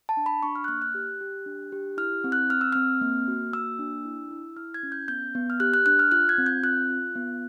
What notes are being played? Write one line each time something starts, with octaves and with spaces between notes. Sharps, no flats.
A5
D4
B5
D4 C#6
F6
F#6
A#3 F6
F#6
G4
G4
D4
G4
E4 F6
C4
F#6
C4 F6
E6
C4 F6
A#3
F#4
A#3 E6
D4
E4
E4
E4 F6
G#6
C#4
G6
B3 G6
B3
F6
G4 F#6
F#6
D4 F#6
F6
F4 F#6
G#6
C4
G6
F4 F#6
F4
B3